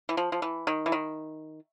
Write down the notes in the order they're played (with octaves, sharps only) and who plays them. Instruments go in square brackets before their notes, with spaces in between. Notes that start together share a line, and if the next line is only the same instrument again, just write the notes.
[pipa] E3
F3
F3
E3
D#3
E3
D#3